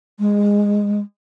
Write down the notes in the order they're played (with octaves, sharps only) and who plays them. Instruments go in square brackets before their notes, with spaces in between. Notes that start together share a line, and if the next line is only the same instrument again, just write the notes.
[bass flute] G#3